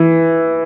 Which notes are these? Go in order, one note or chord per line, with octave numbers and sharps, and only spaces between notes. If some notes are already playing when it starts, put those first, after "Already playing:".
Already playing: E3